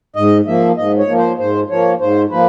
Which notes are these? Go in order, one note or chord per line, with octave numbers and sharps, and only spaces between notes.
G#2 D#5
F3 A#3 E5
G#2 D#5
C#5
F3 A#3
C5
G#2 C5
F3 A#3 C#5
G#2 C5
F3 A#3 B4